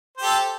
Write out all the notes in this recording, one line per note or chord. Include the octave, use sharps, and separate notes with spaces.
G4 A4 C5